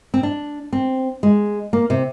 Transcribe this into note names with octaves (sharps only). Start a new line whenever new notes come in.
C4
D4
C4
G#3
A#3
C3